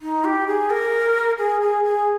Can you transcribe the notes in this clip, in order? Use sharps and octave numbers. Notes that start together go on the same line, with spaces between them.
D#4
G4
G#4
A#4
G#4
G#4
G#4